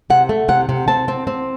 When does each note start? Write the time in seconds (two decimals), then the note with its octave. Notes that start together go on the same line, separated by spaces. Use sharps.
0.10 C3 F#5
0.29 A3
0.48 C3 F#5
0.69 C3
0.88 C4 A5
1.08 C4
1.27 C4